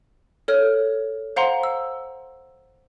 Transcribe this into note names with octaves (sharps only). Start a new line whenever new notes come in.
A4 C#5 F6
C5 F5 F#5 A#5 C6
E6